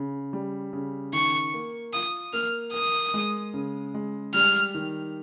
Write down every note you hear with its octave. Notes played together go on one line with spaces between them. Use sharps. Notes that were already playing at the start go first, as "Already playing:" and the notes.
Already playing: C#3
G3
C#3
D#3 C#6
A#3
F4 D#6
A#3 F6
A#4 D#6
G#3
C#3
G#3
G3 F6
D#3